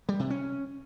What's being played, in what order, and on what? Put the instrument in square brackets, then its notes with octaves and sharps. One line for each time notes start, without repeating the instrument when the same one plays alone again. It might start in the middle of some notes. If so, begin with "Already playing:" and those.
[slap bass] G3
C3
C#4